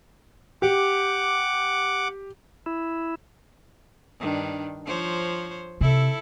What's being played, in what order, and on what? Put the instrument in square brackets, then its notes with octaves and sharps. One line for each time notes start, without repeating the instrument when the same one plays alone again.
[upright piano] G4 [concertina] F#5 D6
[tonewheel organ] E4
[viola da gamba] G2 D#3 D4
F3 C5 C#5
[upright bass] C3 [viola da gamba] E4 A4